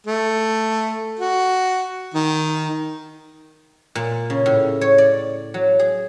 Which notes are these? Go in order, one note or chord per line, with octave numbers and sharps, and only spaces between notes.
A3
F#4
D#3
A#2
C#3
A2
C#5
D5
F#3
G#4